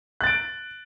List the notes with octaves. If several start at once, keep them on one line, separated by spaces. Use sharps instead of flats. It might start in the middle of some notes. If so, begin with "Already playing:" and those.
F#6 A6 D7